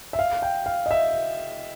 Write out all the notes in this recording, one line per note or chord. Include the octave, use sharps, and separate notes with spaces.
E5
F5
G5
F5
D#5
E5